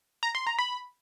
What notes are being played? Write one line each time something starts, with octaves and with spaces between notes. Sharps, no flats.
A#5
C6
A#5
B5